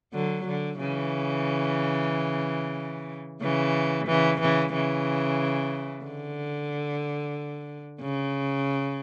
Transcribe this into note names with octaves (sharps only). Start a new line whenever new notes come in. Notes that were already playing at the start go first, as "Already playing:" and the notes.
D3 F#3
D3
C#3 E3
C#3 E3
C#3 E3
C#3 E3
C#3 E3
D3
C#3